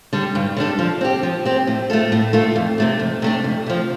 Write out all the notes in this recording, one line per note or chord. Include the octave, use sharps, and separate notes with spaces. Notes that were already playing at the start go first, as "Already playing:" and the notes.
D3 G3 D4 A4
G2
D3 G3 D4 A4
F3
C4 G4
F3
C4 G4
A2
A3 F4 A4
A2
A3 F4 A4
F2
C3 A3 D4
F2
C3 A3 D4
F2
C3 F3